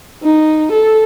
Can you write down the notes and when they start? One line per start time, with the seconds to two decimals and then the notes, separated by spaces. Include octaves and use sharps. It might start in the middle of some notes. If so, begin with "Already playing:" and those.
0.23 D#4
0.72 A4